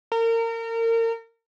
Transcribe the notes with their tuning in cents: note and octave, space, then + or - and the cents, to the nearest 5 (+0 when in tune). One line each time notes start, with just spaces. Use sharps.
A#4 -30